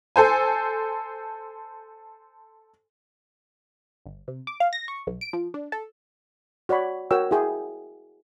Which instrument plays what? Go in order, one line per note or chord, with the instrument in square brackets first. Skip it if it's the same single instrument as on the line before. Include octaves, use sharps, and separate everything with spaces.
[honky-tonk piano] A4 C5 G#5
[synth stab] G1
C3
D6
F5
A#6
C#6
B1
D7
F3
D4
A4
[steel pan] F#4 C#5 D5 B5
F#4 A#4 C#5 G5 E6
E4 G#4 G5